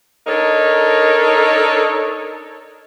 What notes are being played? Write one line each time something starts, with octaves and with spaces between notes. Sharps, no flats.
D4 D#4 A4 A#4 C#5